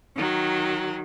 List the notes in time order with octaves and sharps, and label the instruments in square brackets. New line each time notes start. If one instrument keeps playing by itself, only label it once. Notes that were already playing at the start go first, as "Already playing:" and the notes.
[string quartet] D#3 F#3